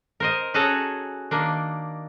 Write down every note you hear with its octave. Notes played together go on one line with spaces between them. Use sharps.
A#4 C5 D#5
C#4 F#4 G#4 A4 A5 A#5
D#3 A#3 D4